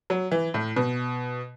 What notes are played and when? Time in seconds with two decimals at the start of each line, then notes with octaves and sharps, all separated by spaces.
0.10 F#3
0.32 E3
0.54 A2
0.76 B2